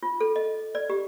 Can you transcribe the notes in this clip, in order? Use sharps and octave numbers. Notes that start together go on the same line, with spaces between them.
F4
A4
D#5
D5
G4